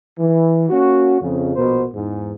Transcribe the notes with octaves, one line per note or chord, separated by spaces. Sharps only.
E3
A#3 C#4 F#4
F2 C#3
A#1 B2 B3 A#4 C5
E2 G#2